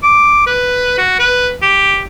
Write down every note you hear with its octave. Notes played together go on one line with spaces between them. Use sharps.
D6
B4
F#4
B4
G4